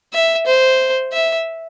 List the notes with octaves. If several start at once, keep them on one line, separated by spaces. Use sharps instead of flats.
E5
C5
E5